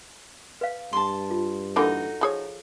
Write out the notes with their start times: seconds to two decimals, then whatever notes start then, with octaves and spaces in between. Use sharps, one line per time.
0.61 B4 F5
0.93 G2 A5 C6
1.31 F4
1.76 D3 E3 A#3 D#4 F#4 A4
2.21 F3 G#4 C#5